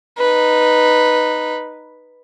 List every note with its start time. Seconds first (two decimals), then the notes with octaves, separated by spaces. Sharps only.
0.18 D#4 B4